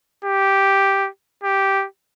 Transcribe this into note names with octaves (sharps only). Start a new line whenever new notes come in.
G4
G4